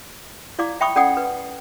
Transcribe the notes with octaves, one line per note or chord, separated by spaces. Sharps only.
E4 D5 F5 D6
E5 G5 B5 C#6 D#6
C#4 A4 D5 F#5 G5 D#6
B4